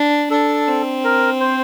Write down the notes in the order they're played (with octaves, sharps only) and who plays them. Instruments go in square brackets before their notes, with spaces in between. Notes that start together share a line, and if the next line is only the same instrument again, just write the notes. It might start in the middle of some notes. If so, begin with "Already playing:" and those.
Already playing: [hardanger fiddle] D4
[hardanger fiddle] D4 [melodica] A4
[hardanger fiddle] C4
[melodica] A#4
C5